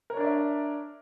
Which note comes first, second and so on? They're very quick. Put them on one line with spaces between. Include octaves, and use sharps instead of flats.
A#4 C#5 D4 D5 E5